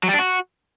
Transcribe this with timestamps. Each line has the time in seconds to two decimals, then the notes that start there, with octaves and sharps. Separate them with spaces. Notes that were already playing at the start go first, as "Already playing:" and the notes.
0.03 F#3
0.09 G3
0.14 D4
0.19 F#4